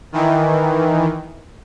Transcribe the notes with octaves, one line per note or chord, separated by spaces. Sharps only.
D#3 E3